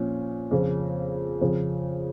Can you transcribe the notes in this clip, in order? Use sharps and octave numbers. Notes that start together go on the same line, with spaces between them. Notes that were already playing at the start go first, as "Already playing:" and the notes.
Already playing: A#2 F3 C#4
F2 C#3 F3
F2 C#3 F3